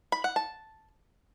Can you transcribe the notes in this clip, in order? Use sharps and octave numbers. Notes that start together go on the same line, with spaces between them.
B5
F#5
A5